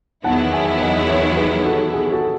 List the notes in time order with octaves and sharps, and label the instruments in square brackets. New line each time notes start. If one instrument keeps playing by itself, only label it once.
[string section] E2 D#3 F#3 B3 E4 [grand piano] F#5 A5
[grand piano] E5 G#5
D#5 F#5
C#5 E5
G#4 B4
F#4 A4
G#4
F#4 A4